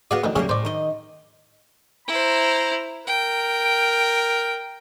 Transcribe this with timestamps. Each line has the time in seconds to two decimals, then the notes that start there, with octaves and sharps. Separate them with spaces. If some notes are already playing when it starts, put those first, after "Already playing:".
0.11 B3 F#4 G#4 D5 F5 F#5
0.24 A2 D3 E3 D#4
0.36 A2 C#3 G3 A#3 C#4 G#4
0.49 A2 C5 D5
0.65 D#3 D#5
2.08 E4 C5 A#5
3.07 A#4 G5